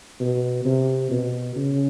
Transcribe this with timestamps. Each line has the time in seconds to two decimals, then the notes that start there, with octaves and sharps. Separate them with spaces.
0.20 B2
0.65 C3
1.10 B2
1.56 C#3